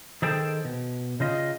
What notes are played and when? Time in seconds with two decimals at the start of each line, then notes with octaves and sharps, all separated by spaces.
0.22 D#3 G#4 A4 C5 G5 A5
0.65 B2
1.20 C#3 F4 D#5